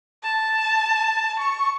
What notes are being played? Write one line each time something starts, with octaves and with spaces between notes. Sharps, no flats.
A5
C#6